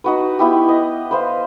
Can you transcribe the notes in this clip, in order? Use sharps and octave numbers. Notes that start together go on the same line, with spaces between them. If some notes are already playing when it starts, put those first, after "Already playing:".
D#4 F#4 B4
B3 E4 G4
D#5
B4 C5 F5